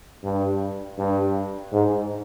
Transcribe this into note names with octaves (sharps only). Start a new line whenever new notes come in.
G2
G2
G#2